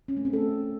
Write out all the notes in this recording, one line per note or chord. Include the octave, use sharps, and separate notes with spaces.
C#4
A3
C4
A4